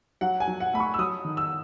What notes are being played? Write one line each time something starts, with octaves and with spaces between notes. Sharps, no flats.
F#3 F#5
G#5
F#3
F#5
A3 B5
C#6
E6
F#3 D#6
D#3
E6